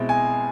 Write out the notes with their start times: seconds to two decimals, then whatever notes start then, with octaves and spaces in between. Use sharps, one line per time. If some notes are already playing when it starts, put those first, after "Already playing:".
Already playing: B2 G#3 C4 E4
0.09 G#5